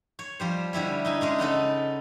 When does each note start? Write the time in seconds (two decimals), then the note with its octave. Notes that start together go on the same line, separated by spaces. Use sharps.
0.19 C#5
0.40 F3 G3 C5
0.73 D3 G3 E4 C#5
1.05 D#4 E4 G#5
1.21 G#3 C#4 D4
1.39 C#3 B3 D#4 A4